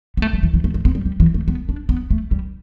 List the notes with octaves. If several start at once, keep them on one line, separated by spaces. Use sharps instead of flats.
B3
A3
G3
E3
E3
A3
A3
B3
G3
G3
E3
A3
B3
D4
B3
A3
G3